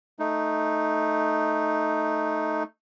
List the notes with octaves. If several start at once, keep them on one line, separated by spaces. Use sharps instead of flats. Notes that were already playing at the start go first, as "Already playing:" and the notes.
A3 D#4